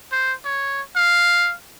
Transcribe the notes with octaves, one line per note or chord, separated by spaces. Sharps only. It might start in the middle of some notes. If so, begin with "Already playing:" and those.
C5
C#5
F5